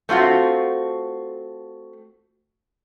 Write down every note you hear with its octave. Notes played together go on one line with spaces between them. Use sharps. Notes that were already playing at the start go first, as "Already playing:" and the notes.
A3 C4 F4 F#4